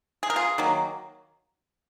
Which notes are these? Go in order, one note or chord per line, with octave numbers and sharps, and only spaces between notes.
G#4
A#4
F4 G#4
D#3 F#3 A#3